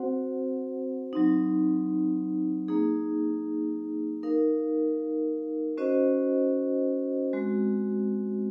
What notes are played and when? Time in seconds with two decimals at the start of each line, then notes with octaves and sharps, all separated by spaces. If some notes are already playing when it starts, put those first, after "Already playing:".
Already playing: C4 F#4 C5 F#5
1.13 F#3 C4 D#4
2.68 A#3 D#4 G#4
4.23 D#4 A#4 F5
5.77 C#4 F#4 C5 D#5
7.33 G#3 C4 F#4